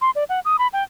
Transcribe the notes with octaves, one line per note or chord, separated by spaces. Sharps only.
C6
D5
F#5
D#6
B5
G5